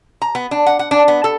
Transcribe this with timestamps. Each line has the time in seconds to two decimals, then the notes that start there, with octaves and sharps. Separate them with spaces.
0.22 A#5
0.35 B3
0.51 D4
0.66 F#5
0.79 F#5
0.91 D4
1.08 B3
1.24 A4